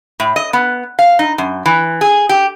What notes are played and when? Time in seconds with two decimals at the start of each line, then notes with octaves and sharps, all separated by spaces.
0.20 A2
0.36 D#5
0.53 B3
0.99 F5
1.19 D#4
1.38 F#2
1.66 E3
2.01 G#4
2.29 G4